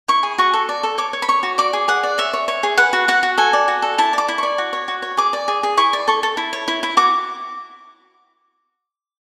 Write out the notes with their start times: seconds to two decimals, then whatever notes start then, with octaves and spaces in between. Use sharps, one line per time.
0.08 E4 C#6
0.23 G#4
0.38 F#4 C#6
0.53 A4
0.69 D5
0.83 A4
0.98 C#5 D6
1.13 C#5
1.22 B5
1.28 C#5 C#6
1.43 F#4
1.58 D5 D6
1.73 G#4
1.88 G#4 F#5
2.03 D5
2.18 C#5 E5
2.33 C#5
2.48 C#5
2.63 G#4
2.77 B4 F#5
2.93 F#4
3.08 F#4 F#5
3.23 F#4
3.38 A4 G#5
3.53 D5
3.68 F#4
3.82 A4
3.98 E4 A5
4.13 D5 D6
4.28 E4
4.38 D5 C#6
4.58 F#4
4.73 C#5
4.88 F#4
5.02 C#5
5.17 G#4 D6
5.33 D5
5.48 G#4
5.63 G#4
5.77 E4 C#6
5.93 D5
6.08 A4 C#6
6.23 A4
6.37 E4
6.53 C#5
6.68 E4
6.83 E4
6.97 F#4 D6